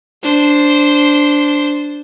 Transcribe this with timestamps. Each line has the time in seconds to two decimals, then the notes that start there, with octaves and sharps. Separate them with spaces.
0.23 D4 C5